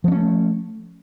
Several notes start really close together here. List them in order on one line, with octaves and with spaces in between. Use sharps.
F3 B3 C#4 A3